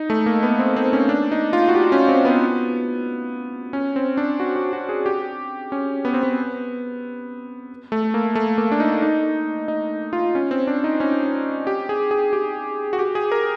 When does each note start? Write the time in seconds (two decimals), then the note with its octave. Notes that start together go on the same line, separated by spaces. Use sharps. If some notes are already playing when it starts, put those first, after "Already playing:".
Already playing: D#4
0.10 A3
0.26 A#3
0.43 B3
0.59 C4
0.76 C4
0.93 C#4
1.09 D4
1.31 D#4
1.53 F4
1.69 F#4
1.75 G4
1.92 C#4
2.09 C4
2.25 B3
3.73 C#4
3.96 C4
4.17 D4
4.40 F#4
4.56 F#4
4.73 F#4
4.89 G#4
5.06 G4
5.72 C#4
6.05 B3
6.14 C4
6.23 B3
7.92 A3
8.14 A#3
8.35 A3
8.58 A#3
8.72 D4
8.80 D#4
9.02 D#4
9.68 D#4
10.13 F4
10.35 C#4
10.51 C4
10.67 D4
10.84 D#4
11.00 C#4
11.67 G4
11.89 G#4
12.11 G#4
12.33 G4
12.93 F#4
12.99 G4
13.15 G#4
13.32 A#4